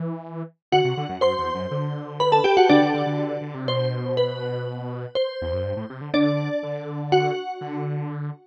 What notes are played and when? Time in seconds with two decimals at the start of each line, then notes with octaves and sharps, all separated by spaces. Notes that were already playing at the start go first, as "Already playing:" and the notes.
Already playing: E3
0.72 D3 F#4 F#5
0.84 C3
0.97 D3
1.09 F#2
1.21 F#2 C5 C6
1.38 E2
1.55 F#2
1.71 D3
2.20 B4 B5
2.32 A4 A5
2.44 G4 G5
2.57 F#4 F#5
2.69 D3 D4 D5
2.81 D3
2.94 D3
3.06 D3
3.41 D3
3.54 C3
3.68 B2 C5
4.17 B4
5.15 C5
5.42 E2
5.53 F#2
5.65 G2
5.77 A2
5.90 C3
6.01 D3
6.14 D3 D4 D5
6.63 D3
7.12 F#4 F#5
7.61 D3